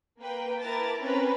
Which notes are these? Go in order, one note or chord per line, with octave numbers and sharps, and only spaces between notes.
A#3 B4 G5
E4 A#4 B4 A5 D6 A6
C4 C#4 A#4 B4